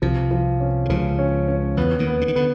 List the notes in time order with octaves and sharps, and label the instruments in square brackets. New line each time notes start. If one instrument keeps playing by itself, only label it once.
[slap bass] C2 C3 [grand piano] F3
[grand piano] F3
C#4
[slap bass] D3
[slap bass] C#2 C#3 [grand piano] F3
[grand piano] C#4
C#4
[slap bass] E2 E3 [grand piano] B3
[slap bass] D#2 D#3
[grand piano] B3
[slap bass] D3
D#3
[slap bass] D3 [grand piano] B3